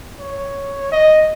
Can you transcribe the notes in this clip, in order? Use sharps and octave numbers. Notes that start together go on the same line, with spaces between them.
C#5
D#5